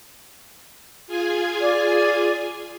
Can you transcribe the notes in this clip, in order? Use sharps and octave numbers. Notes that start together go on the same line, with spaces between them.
F4 G#4 G#5
D5